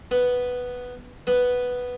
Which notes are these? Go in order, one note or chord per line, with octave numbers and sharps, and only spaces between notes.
B3 B4
B3 B4